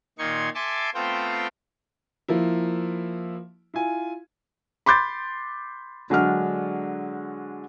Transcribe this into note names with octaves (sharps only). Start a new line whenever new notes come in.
A#2 D#3 D#4 C6 C#6 G#6
A4 E5 G#5 A5 C6 D6
A3 B3 C4 F4 C5 G5
F3 A#3 E4
E4 F4 G#5
B5 C6 D6 G6 A6
D3 F#3 G#3 D4 F6